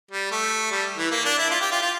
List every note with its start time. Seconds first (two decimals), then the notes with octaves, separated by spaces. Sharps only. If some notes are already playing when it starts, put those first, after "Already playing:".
0.11 G3
0.31 A3
0.71 G3
0.98 E3
1.11 A#3
1.25 D4
1.38 E4
1.51 F4
1.61 G4
1.72 F4
1.82 F4